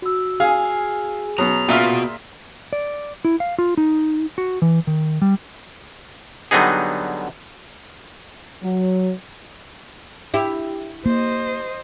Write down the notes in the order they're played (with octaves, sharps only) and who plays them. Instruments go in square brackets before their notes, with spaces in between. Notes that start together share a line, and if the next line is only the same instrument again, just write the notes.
[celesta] F#4 E6
[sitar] G#4 [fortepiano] F5
[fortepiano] B2 F#3 [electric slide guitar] A#5 [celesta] D#6
[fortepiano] A#2 E5 F6 [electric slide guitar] B3 F#4 [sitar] F4
[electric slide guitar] D5
E4
F5
F4
D#4
F#4
E3
D#3
G3
[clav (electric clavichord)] D3 F#3 G3 B3 D#4 G#4
[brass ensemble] F#3
[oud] E4 G4
[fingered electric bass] A#3 [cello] C5 D#5